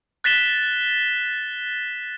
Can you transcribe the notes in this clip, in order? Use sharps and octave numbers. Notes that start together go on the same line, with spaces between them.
F#6 A6 B6 E7 G7